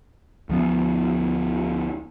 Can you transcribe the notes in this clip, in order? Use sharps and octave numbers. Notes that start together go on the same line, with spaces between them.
D2 F3 B3